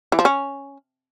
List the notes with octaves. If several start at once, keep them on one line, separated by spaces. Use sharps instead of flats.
E3
F3
C#4